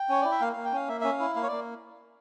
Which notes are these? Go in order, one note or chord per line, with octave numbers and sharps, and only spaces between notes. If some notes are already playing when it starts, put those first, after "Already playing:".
Already playing: G5
C#4 C#5
E4 D5
E5
A#3 F5
A#3 F5
G5
C#4 F5
A#3 E5
C#4 E5
F5
E4
A#3 F5
C#5
A#3 D5